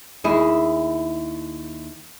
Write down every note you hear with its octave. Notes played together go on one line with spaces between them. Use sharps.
D#2 E4 G#4